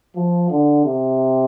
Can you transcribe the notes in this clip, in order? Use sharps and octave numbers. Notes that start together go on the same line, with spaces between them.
F3
D3
C3